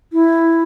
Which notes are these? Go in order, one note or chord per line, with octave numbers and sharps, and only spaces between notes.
E4